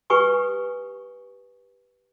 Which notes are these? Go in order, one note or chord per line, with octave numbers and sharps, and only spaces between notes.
G4 B4 G#5 C#6 D#6